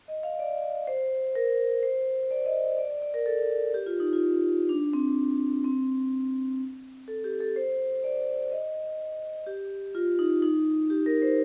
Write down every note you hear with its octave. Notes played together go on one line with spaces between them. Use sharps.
D#5
F5
D5
C5
A#4
C5
D5
D#5
D5
D5
D5
A#4
A4
G4
F4
D#4
F4
D4
C4
C4
A4
G4
A4
C5
D5
D#5
G4
F4
D#4
D#4
G4
A#4
C5